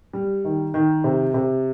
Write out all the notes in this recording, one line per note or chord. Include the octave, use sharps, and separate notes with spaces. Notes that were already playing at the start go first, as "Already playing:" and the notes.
G3
D#3
D#3
C3
C3